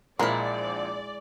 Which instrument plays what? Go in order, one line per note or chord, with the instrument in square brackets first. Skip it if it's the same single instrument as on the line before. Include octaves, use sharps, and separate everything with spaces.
[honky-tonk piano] A#1 F3 [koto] G#3 E4 [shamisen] A#3 A#4 [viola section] D5